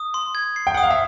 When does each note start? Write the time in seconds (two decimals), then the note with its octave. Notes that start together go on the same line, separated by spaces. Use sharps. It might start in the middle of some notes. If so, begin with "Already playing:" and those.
Already playing: D#6
0.14 C6
0.35 G#6
0.56 C7
0.67 G5
0.75 F#5 D#6
0.83 F5
0.90 E5